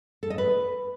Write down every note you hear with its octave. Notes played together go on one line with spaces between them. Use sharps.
A4
D#5
B4